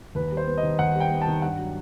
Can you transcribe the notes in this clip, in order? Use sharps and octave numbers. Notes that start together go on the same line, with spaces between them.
D#2 B4
G3
C5
B3
D#5
D#3
D#2 F#5
G3
G5
B3
A5
D#3
G2 F#5
F#3